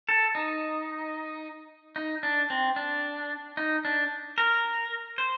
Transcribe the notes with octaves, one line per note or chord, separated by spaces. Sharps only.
A4
D#4
D#4
D4
C4
D4
D#4
D4
A#4
C5